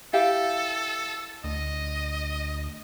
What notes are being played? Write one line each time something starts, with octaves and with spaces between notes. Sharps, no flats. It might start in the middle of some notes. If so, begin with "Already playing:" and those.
E4 G4 A4 F5
D2 D#5